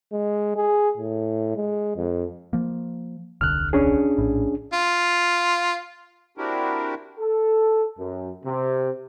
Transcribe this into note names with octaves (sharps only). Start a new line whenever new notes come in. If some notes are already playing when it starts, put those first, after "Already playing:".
G#3
G#4
A2
G#3
F2
F3 A#3
D#1 C2 D3 F6 F#6
C#4 D4 G#4
A#1 A2
F4
C4 D4 E4 F#4 G4 A#4
A4
F#2
C3